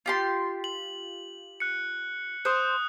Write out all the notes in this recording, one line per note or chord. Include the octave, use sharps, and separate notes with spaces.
F4 G4 C6
F#7
F#6 C#7
C5 D#6 F#6